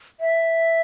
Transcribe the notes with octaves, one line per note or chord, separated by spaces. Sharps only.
E5